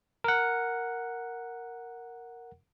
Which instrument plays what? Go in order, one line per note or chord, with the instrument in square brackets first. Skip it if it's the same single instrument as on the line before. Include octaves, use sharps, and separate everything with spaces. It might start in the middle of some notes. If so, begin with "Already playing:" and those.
[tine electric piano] A#4 F#5